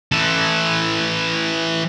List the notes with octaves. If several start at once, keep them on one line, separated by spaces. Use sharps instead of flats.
E3 A4